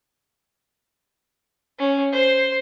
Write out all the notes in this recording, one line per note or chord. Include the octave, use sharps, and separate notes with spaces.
C#4
C5